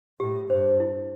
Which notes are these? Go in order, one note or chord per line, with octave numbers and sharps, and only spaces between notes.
A2 G4
G2 C5
E4